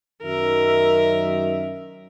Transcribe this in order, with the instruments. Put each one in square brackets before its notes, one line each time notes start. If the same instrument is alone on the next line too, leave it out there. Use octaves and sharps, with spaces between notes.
[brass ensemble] F#2 D#3 E5 [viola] A#4